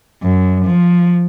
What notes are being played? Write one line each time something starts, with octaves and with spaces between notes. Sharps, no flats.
F#2
F3